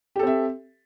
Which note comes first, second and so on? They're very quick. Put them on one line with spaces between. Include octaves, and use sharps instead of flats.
G4 A4 C4 E5